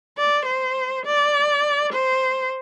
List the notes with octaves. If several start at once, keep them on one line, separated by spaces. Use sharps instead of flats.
D5
C5
D5
C5